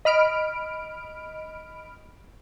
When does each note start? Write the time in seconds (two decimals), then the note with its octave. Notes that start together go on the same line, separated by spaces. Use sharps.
0.05 D#5 B5 F6 D7